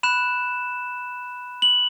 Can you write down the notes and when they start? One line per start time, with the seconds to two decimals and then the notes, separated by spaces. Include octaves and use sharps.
0.03 B5 F#6 E7
1.62 F#7